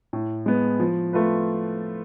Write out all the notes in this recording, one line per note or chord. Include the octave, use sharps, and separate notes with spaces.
A2
G#3 B3
F3
A3 F4 B4